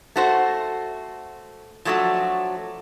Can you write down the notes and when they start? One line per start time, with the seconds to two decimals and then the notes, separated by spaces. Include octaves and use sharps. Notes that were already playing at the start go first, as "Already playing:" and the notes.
0.16 A3 F#4 C5
1.85 F3 F#3 A3 D4 F#4